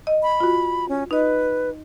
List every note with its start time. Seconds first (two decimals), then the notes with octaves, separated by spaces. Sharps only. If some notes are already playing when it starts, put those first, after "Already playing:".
0.07 D#5
0.23 B5
0.41 F4 F#4
0.89 C#4
1.11 D#4 B4 D#5